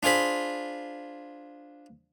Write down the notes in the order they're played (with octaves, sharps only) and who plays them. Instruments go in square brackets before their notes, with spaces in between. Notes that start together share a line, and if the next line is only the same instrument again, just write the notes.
[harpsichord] D4 F4 G#4 C5 B5